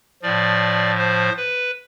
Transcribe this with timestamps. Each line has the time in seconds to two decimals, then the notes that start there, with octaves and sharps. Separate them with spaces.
0.22 A2 F3 D5
0.98 C5
1.37 B4